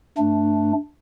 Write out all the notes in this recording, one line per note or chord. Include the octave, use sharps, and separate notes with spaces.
G2 A3 D4